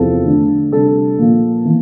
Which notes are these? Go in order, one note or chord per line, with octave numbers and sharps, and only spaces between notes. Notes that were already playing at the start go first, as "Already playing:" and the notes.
Already playing: E2 C3 F3 C4 E4 A4
D3 A3 D4
C3 G3 D4 A4
A#2 F3 A#3
E3 A#3